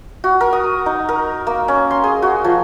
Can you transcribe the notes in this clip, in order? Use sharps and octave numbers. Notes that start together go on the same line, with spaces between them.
F#4
A#4
D#6
D#4
A#4
A#3
C#4
C6
G#4
F#4
F3